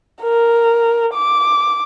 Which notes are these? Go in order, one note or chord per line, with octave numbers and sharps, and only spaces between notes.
A#4
D6